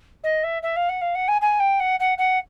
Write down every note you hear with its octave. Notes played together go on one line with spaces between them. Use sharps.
D#5
E5
E5
F5
F#5
F5
F#5
G#5
G#5
G5
F#5
F#5
F#5